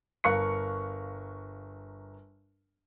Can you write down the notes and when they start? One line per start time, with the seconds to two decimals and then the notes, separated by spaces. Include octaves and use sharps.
0.24 G1 A#4 F5 C#6 F#6 C#7